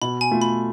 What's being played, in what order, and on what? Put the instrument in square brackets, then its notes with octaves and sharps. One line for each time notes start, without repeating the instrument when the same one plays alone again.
[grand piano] B2 [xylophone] B5
[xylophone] G#5
[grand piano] A3 F4 A4
[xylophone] B5